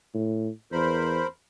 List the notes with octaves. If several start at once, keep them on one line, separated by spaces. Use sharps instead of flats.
A2
E2 A#4 C5 B5